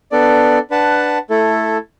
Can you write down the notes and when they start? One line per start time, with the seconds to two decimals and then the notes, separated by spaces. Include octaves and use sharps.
0.12 B3 D4 A4 D5
0.70 D4 B4 F#5 A5
1.30 A3 E4 A4